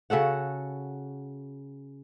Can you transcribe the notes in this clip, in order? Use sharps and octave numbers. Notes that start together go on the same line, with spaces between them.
C#3 F#4 A4 F#5